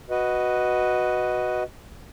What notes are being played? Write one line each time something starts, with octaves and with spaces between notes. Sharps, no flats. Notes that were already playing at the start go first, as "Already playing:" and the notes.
F#4 B4 D#5